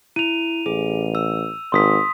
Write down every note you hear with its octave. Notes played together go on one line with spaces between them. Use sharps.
E4 D#7 F7
A1 G#4
E6
G#1 C6 D#6 B6